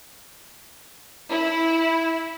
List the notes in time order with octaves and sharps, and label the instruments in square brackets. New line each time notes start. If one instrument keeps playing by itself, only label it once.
[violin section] E4